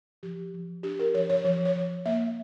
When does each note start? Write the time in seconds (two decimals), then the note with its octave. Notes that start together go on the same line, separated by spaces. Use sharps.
0.23 F3 G4
0.54 F3
0.83 D4 G4
0.99 A#4
1.14 F3 C#5
1.30 C#5
1.44 F3 C#5
1.65 C#5
1.75 F3
2.06 A#3 E5